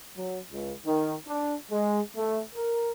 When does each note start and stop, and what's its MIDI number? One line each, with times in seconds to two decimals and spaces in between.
0.17 0.39 54
0.52 0.74 37
0.86 1.15 51
1.28 1.56 62
1.71 2.01 56
2.16 2.41 57
2.55 2.92 70